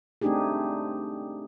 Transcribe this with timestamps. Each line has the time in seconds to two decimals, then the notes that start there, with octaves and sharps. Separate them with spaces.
0.22 A3 C4 D4 D#4 G4 G#4